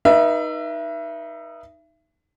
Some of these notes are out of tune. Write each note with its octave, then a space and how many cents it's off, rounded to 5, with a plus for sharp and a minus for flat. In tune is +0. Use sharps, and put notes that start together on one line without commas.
D#4 +0 B4 -40 E5 +25